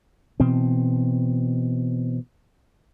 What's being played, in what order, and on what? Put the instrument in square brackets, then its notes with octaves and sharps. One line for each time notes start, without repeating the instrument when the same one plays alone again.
[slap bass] B2 E3 C4